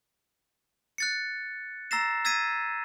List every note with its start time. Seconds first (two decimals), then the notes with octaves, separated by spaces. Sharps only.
0.98 F#6 A6 C#7
1.91 A#5 E6 A6 A#6 C7 E7
2.25 E6 G#6 A6 B6 D#7